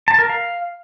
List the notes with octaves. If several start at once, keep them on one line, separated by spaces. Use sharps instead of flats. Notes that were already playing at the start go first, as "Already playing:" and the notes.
A5
A#4
F5